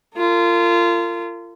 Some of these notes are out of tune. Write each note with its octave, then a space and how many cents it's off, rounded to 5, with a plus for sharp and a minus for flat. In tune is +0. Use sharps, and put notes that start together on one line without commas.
F4 -25 A#4 -45